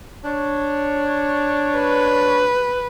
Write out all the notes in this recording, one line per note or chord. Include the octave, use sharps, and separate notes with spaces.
D4 C#5
B4